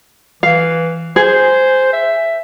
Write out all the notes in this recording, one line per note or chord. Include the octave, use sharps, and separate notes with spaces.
E3 F5
G#4 C5
E5